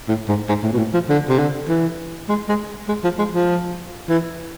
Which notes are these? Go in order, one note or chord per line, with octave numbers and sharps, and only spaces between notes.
A2
G#2
G#2
A2
B2
A2
F3
D3
C3
D3
E3
G#3
G#3
G#3
F3
G#3
F3
E3